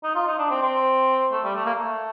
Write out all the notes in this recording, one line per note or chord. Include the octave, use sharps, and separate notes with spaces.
D#4
F4
D#4
D4
C4
C4
A3
G3
A3
A#3
A3